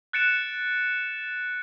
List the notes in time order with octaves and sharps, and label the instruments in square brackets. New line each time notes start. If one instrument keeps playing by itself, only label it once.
[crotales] F#6 A6 C#7 D7 E7